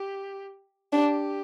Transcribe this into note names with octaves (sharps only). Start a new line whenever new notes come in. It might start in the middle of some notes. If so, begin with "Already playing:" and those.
Already playing: G4
D4 G4